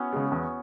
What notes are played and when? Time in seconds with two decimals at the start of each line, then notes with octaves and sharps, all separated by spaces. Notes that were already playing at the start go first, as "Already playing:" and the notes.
Already playing: B3 C#4 E4 F#4
0.13 C#3 G#3
0.32 E2